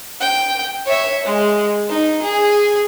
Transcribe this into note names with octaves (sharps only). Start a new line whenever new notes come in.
G5
C#5 E5
G#3
D#4
G#4